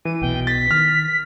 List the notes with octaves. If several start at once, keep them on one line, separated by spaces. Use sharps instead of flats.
E3 D#7
B1 B2 G5
A6 B6
D#3 F6